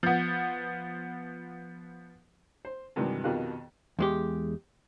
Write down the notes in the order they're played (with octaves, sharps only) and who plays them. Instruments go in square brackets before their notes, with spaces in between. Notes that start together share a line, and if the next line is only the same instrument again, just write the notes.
[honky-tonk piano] F3 B3
[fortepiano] C5
G2 C3 D#3 E3 F#3 G#3
F2 B2 D#3 G4 F5 F#6
[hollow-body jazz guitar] E2 G#3 G4